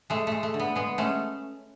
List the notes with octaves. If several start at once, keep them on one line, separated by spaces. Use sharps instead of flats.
G#3 A3
G#3 A3
A3
D3
B3
G#3 B3
G#3 A3 C#4